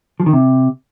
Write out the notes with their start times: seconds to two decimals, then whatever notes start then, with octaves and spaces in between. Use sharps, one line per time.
0.20 F3
0.26 D#3
0.33 C3